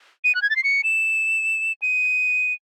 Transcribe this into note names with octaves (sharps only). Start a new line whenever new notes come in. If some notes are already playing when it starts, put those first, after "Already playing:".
D#7
F#6
G#6
A6
C7
C#7
E7
D#7